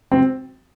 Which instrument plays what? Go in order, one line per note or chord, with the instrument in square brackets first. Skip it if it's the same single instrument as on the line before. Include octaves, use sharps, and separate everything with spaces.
[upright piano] C4